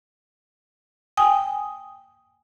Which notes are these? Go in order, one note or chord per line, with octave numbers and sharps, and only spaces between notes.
G5 G#5 D#6